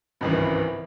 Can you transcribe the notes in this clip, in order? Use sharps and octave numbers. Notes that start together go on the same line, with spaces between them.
G#1 C#2 G2 E3